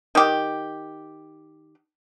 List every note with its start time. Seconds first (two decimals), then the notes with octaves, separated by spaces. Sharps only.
0.15 D#3 G4